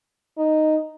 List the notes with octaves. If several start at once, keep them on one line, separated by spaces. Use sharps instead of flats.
D#4